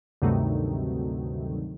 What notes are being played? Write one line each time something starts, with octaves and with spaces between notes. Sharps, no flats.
D2 G2 C3 D#3 F#3 A3